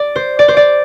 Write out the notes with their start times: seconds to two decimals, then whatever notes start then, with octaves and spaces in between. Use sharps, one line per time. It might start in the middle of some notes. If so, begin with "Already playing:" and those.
Already playing: D5
0.16 C5
0.39 D5
0.48 C5
0.57 D5